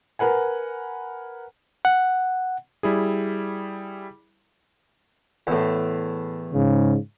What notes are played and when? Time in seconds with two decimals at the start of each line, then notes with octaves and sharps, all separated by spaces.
0.19 A#4 B4 F#5 G#5
1.85 F#5
2.83 G3 E4 G#4
5.47 E2 A2
6.53 G#2 C#3